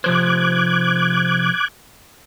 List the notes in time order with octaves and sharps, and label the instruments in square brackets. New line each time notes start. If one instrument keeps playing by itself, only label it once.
[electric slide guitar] C3 F3 C5 [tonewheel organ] D6 F#6 G#6